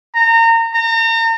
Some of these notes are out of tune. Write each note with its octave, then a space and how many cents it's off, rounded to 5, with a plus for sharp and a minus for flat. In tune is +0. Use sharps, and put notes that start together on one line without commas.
A#5 -30
A#5 -40